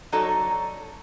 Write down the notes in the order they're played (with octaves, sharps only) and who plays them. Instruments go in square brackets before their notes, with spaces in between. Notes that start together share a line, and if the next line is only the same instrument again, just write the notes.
[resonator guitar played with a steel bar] F#3 D#4 F#4 A4 C#5 D5